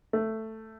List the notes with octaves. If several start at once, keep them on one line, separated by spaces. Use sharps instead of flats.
A3